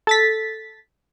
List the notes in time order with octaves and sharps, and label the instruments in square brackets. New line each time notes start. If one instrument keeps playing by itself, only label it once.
[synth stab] A4 A6 B6